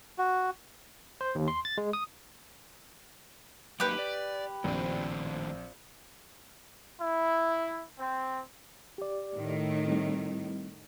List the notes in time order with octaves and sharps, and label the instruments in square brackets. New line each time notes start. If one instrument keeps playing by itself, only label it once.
[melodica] F#4
[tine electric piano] C5
D#2
C6
A6
G#3
D#6
[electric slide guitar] F#3 A#3 D#4 [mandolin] G4 B4
[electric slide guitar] D5
[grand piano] A#1 C4 [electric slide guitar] A2 D#3 D4
[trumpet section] E4
C4
[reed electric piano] G4 D5
[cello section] A2 D#3
[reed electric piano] G3 C4 E4